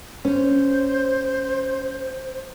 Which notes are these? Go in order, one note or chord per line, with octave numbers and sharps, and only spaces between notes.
C#4 C5